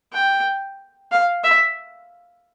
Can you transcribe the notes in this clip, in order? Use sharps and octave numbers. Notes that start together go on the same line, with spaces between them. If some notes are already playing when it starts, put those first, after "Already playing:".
G5
F5
E5